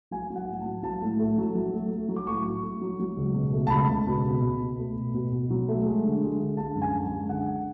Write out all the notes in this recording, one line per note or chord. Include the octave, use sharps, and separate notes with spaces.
F#3 G#5
F#3
F#5
A2
A5
F#3
F#3 A5
A2
A3
F#3
F#3
A3
A3
F#3
D6
A2 C#6
F#3
A3
F#3
F#3
C#2
B2
A3
A5
C#2 B5
C#2
B2
B2
B2
B2
A3
B2
B2
B2
F#3
A3
G#3
D3
G#3
D3
G#3 A5
F#2
G#5
F#2
G#5
G#3
D3 F#5
D3